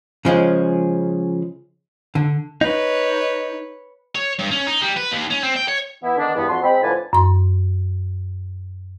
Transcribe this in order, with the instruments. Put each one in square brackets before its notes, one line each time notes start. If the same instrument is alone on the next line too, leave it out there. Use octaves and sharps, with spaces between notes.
[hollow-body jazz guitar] C#3 F3 G#3 C#4
D3
[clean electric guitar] D#4 [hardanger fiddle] B4 C#5
[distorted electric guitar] C#5
G2
C#4
D#4
G3
B4
D#2
C#4
C4
G5
C#5
[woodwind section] E3 B3 E4
D3 D#3 B3 D4
E2 G2 B3
F2 F#4 A5 C6
G#3 C4 B5
A2 D3 F3 B4 G#5 A5
[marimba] F#2 C6